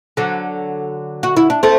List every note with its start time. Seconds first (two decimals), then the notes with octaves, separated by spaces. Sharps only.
0.17 D3 F#3
1.23 F#4
1.37 E4
1.50 D4
1.63 A3 C4